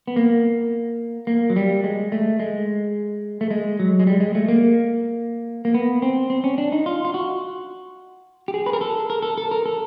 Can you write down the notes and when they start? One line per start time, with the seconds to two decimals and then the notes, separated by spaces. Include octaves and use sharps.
0.08 B3
0.16 A#3
1.27 A#3
1.50 F#3
1.56 G3
1.84 G#3
2.12 A3
2.40 G#3
3.41 A3
3.50 G#3
3.79 F#3
3.99 G#3
4.07 G3
4.20 G#3
4.35 A3
4.48 A#3
5.65 A#3
5.74 B3
6.02 C4
6.30 C4
6.44 C#4
6.58 D4
6.72 D#4
6.86 F4
7.05 F4
7.14 F#4
8.48 G4
8.54 G#4
8.66 B4
8.73 A#4
8.81 A4
9.10 A#4
9.22 A4
9.38 A4
9.51 A#4
9.66 A4